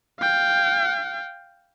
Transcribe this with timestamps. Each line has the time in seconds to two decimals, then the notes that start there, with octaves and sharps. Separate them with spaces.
0.19 F5 G5